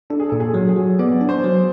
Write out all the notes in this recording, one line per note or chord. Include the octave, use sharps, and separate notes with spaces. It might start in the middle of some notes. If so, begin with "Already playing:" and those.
D4 A4
G#4
A#2 A4
G#4
F#3
G#4
F#3
B3 D5
D4
C5
F#3